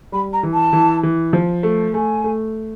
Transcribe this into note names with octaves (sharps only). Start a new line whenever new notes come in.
G3 B5
A#5
E3
A5
E3
E3
F3
A3
A3 G#5
A3